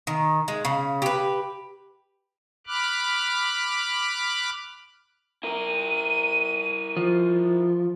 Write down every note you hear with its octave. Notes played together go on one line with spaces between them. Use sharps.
D#3
G#3
C#3
G4 B4
B5 D6 F6 F#6
E4 A#4 D#7
F3